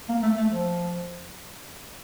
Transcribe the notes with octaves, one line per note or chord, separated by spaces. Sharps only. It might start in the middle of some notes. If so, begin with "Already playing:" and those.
A#3
A3
A3
F3